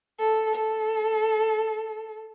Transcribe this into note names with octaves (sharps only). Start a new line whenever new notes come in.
A4
A4